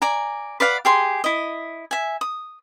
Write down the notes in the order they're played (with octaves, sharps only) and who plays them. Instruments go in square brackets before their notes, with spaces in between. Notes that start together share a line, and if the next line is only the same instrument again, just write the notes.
[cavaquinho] D5 G#5 A#5
B4 D5 F5 F#5
G4 G#4 C6
E4 D#5
E5 G#5
D#6